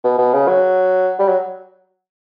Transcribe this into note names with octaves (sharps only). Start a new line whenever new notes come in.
B2
B2
C#3
F#3
G3
F#3